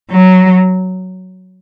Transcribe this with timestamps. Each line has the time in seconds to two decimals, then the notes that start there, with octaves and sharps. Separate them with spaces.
0.11 F#3